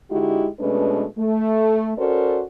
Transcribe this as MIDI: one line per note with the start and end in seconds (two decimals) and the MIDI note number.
0.11 0.47 50
0.11 0.47 56
0.11 0.47 63
0.11 0.47 64
0.11 0.47 66
0.11 0.47 67
0.60 1.05 47
0.60 1.05 56
0.60 1.05 57
0.60 1.05 61
0.60 1.05 62
0.60 1.05 71
1.18 1.93 57
1.97 2.42 61
1.97 2.42 66
1.97 2.42 69
1.97 2.42 70
1.97 2.42 72
1.97 2.42 74